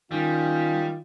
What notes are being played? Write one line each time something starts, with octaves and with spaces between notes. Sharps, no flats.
D#3 G3 C#4 F4